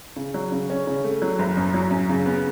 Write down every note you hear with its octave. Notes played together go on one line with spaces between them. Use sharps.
C#3
F#3
C#3
C#4
C#3
A3
F#3
F#1
F#2
F#3
F#2
C#3
B3